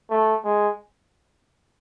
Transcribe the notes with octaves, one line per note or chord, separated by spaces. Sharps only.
A3
G#3